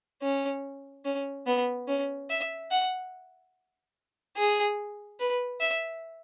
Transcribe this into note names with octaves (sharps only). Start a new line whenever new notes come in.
C#4
C#4
B3
C#4
E5
F#5
G#4
B4
E5